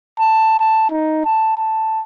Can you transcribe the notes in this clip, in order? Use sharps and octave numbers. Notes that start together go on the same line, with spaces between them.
A5
A5
D#4
A5
A5